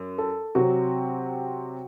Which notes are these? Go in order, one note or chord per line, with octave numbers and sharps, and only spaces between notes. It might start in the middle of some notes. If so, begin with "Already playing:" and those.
Already playing: F#2
A4
C3 F#3 C4 F#4